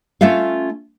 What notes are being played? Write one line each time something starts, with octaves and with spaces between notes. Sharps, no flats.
A3 C#4 F4 E5 F5